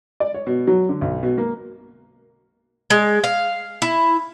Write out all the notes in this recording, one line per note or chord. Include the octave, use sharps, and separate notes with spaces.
D5
C#5
B2
F#3
D3
B1
B2
A#3
G#3
F5
E4